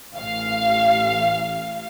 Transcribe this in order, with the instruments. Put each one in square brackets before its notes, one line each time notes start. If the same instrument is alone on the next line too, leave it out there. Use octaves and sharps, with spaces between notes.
[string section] A1 F5